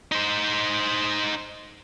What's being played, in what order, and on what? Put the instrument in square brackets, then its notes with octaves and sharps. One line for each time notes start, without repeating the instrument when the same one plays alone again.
[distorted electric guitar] D#4 C5